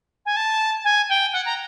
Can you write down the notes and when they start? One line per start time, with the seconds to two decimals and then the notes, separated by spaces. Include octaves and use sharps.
0.26 G#5
0.36 A5
0.84 G#5
1.09 G5
1.33 F#5
1.45 A#5